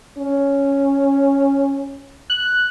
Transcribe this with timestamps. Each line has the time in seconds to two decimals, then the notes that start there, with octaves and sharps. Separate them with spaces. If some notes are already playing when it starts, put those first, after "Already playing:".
0.18 C#4
2.30 F#6